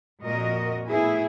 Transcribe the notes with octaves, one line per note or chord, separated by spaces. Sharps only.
F2 A#2 F#4 A#4 D#5
A2 B3 E4 G#4